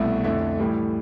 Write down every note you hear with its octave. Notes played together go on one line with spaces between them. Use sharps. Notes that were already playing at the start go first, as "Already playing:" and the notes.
Already playing: C2 B2 A3 E4
F2 D3 A3 E4
A2 E3 G3